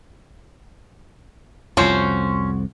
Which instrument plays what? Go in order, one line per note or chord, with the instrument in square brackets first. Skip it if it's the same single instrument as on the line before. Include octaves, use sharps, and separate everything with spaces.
[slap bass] C2 F2 [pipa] F3 C#4 [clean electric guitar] F#4 C5